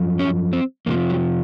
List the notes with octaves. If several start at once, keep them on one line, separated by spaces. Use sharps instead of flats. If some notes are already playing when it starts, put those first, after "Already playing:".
Already playing: F#2 F3
C#4
C4
F2 C3 F3 A#3
F#3